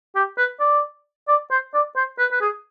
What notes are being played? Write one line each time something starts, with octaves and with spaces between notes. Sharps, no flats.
G4
B4
D5
D5
C5
D5
C5
B4
B4
G#4